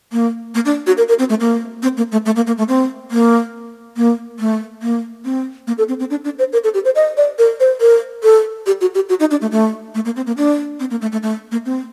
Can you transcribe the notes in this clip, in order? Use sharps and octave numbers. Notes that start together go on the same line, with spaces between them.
A#3
A#3
D4
F#4
A#4
A#4
C4
A3
A#3
C4
A#3
A3
A3
A#3
A#3
A3
C4
A#3
A#3
A3
A#3
C4
A#3
A4
C4
C4
D4
D4
C5
A#4
A4
G4
C5
D#5
D5
A#4
C5
A#4
A4
G4
F#4
G4
F#4
D#4
D4
A3
A3
A3
A#3
C4
A#3
D4
C4
A#3
A3
A3
A3
A#3
C4